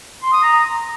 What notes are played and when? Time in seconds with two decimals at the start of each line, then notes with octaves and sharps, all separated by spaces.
0.23 C6
0.33 D#6
0.43 A#5